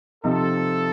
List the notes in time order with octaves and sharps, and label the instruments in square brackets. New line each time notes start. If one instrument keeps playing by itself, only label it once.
[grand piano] C3 F3 C4 D#4 [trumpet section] A4